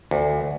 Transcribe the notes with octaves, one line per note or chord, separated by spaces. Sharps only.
D2